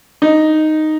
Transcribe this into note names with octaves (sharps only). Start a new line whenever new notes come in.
D#4